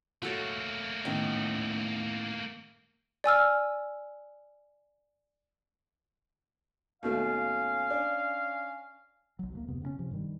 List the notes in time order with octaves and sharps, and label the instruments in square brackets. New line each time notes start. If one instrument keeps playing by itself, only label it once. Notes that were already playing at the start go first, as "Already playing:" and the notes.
[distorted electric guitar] A3 A#3 [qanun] F#4 A4 C#5
[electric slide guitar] A2 C#4 [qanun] D#3 B3
[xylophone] D5 G#5 E6 F6
[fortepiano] D#2 B2 A3 [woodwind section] C#4 F5
[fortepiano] D4
[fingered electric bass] B1 F#3
D2 F#3 A#3
F2 C3 B3
C#3 B3 C#4
C3 F3
G2 D#3 G3